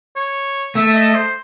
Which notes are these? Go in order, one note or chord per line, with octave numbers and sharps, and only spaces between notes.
C#5
A3 E5
D#5
C5